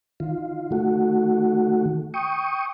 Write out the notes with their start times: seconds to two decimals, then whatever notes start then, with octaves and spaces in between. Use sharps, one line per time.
0.20 D#3 F4
0.72 D#3 A3 F#4
2.14 G5 C#6 D#6